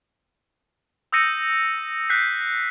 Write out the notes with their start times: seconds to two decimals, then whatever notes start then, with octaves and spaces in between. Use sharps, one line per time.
1.12 D#6 E6 G6 A#6 C#7 D#7
2.10 F#6 G6 B6 C7